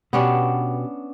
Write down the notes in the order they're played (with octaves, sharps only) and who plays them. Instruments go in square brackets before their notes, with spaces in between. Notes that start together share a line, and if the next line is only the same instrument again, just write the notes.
[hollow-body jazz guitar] B2 G4 [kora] B3 C#4 D4